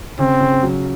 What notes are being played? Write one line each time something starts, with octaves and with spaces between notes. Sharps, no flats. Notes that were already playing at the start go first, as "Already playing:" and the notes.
C#3 C4
C#3
F#3